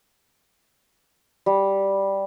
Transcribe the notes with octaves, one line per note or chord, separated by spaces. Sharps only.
G3